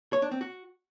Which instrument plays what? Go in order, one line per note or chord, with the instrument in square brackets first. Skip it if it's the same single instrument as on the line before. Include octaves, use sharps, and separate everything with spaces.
[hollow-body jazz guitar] C#5
D4
C4
F#4